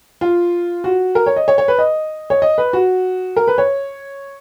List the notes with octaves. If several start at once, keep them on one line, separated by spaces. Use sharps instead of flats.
F4
F#4
A#4
C#5
D#5
C#5
C#5
B4
D#5
C#5
D#5
B4
F#4
A#4
B4
C#5